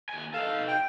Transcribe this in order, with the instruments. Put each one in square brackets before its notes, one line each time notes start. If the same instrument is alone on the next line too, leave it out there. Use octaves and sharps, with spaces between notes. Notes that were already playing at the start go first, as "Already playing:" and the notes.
[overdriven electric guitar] D#2 G#5
[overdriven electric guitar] D#4 A4 [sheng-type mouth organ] F5
[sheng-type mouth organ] G5